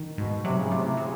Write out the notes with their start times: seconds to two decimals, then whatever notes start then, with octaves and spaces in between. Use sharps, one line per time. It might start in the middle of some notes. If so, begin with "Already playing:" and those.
Already playing: D#3
0.17 G#2 B2
0.44 C3 F#3
0.57 C#3
0.71 A2 C3
0.84 C3
0.97 C#3 F#3